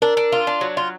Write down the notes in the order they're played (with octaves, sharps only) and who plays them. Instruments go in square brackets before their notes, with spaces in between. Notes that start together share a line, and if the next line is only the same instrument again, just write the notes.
[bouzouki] D4 [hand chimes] A#4
[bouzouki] D4
F4
D4
F#3
F4